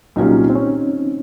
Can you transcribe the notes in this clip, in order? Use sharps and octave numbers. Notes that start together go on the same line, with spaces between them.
C2 A#2 F#3 C#4 D#4 F4
C4
C#4